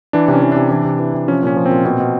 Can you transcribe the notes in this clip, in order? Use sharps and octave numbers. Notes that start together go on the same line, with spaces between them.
E3 D4
C3 C#4
E3
C3 D4
E3 D4
C3
E3
C3
F3 C#4
A#2 C#4
F3
A#2 C4
B2 C4
B2